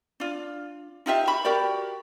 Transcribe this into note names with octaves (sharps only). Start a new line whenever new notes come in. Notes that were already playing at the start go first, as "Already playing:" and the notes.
D4 F4
D#4 F4 G4 E5
F#4 E5 B5
F#4 G4 A#4 D5